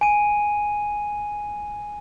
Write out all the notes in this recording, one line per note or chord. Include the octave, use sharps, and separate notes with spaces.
G#5 D#7